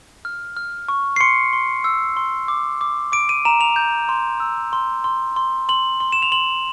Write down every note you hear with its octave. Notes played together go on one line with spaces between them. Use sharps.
F6
F6
C#6
C7
C6 C#7
C6
E6
C6
D6
D6
D6 D7
D#7
A#5 E7
F7
G6
C6
E6
C6
C6
C6
C6 F#7
C6
E7
F7
C6 F#7